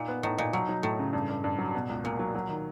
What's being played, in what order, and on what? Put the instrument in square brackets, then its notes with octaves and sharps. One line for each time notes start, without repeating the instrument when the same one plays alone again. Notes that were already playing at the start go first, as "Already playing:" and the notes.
Already playing: [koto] A#2 [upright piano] D#4
[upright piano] B3
[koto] A2 [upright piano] D#4
[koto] A#2 [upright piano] D#4
[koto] B2 [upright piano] F#3
[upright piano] F#3
[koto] A2 [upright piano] A3
[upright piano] C#3
G2
G2
G2
F#3
B2
C#2
[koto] A#2 [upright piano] A#3
[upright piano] F#3
F#3
D#3